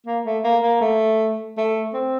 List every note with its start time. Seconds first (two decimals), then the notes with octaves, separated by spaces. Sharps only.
0.07 A#3
0.25 A3
0.44 A#3
0.63 A#3
0.81 A3
1.57 A3
1.94 C4